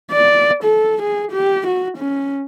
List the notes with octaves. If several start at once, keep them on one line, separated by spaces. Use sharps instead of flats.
D5
A4
G#4
G4
F#4
C#4